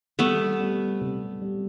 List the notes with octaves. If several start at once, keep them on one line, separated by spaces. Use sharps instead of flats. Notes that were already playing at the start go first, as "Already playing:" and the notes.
G3 A3 B3
G3
C3
G3